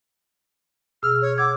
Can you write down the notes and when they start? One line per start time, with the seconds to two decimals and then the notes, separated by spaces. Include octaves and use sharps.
1.03 B2 G#4 E6 F6
1.22 C#5
1.38 F#5 D6 E6 G#6